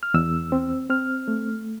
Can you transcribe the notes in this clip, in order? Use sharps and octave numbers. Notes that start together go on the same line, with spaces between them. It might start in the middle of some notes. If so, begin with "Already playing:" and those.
F6
E2 E6
C4
C4 F6
A3